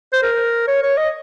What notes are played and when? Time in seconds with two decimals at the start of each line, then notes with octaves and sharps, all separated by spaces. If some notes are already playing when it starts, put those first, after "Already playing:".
0.13 C5
0.23 A#4
0.68 C#5
0.83 C#5
0.98 D#5